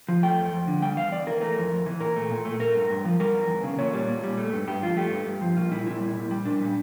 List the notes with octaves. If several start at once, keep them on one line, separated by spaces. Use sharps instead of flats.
F3
A3 G5
F2
F2
D3
G3 G5
E2 F5
E2 D5
E3 A#4
A3 A#4
F2
F2
E3
A#2 A#4
A3
A#2
A3
A3 A#4
G2
G2
F3
G3 A#4
E2
E2
C#3
A#2 C#5
G3
A#2
G3
A3
G2
G2 G4
F3 F4
A3 G4
G2
G2
F3
A#2 F4
G3 E4
A#2 E4
G3
A#2
G3
A#2 D4
G3